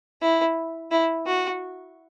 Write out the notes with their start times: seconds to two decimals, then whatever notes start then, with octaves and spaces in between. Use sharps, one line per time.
0.21 E4
0.91 E4
1.26 F#4